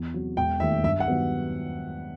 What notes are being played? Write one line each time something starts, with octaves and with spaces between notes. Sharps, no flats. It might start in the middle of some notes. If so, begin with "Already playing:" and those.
Already playing: E2
C3 F#3
E1 G5
D#2 D#3 A3 E5
G2 E5
F#5
D#3 F#3 B3